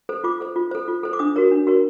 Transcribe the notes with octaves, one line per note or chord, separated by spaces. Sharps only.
A4 C5
F4 D6
A4 C5
F4
A4 C5
F4
A4 C5
D6
D4 D#6
F#4 A#4 C#5
D4
F#4 A#4 C#5